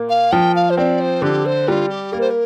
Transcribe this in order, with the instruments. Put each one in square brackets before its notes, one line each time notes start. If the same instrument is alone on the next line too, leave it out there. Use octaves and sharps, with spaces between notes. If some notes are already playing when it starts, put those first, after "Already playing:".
Already playing: [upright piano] A#2 A#3
[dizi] F5
[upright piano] F3 [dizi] G5
[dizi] F5
C5
[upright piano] C4 [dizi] D5
[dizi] C5
[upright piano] D3 [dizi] G4
[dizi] C5
[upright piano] G3 [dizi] F4
[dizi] G4
[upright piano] A#3 [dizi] A#4
[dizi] C5
A#4